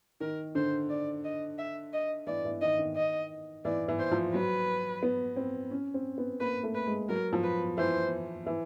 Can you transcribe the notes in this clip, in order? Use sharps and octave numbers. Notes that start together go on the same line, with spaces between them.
D#3 A#4
D3 C5
D5
D#5
E5
D#5
E3 D5
E3
D#3 D#5
D#3
D#5
E3 D5
E3
C5
F3
F#3 B4
B3
C4
C#4
C4
B3
A#3 B4
A3
B4
G#3
F#3 A#4
F3
B4
E3 C5
E3